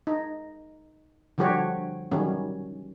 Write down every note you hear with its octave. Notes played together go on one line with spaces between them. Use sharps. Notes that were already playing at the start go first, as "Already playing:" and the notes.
D#4
D3 F3 G3 F#4 G4 C#5
D#3 F#3 G3 C#4